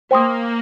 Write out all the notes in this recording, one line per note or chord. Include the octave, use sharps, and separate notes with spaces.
A#3 C5 G5 C6 D#6